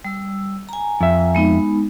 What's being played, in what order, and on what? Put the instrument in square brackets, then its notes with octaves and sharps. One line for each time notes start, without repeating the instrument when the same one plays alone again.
[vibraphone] G3 E6
G#5 A#5
[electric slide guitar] F2 E5
[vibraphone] G#3 B3 D#4